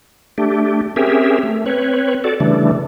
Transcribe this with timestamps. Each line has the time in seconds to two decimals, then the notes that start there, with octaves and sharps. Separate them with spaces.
0.38 A3 D4 G4
0.96 C4 C#4 G4 G#4 A#4 E5
1.43 A3
1.66 C4 B4 C#5
2.24 F#4 A4 D5
2.40 C#3 E3 G3 A3 D4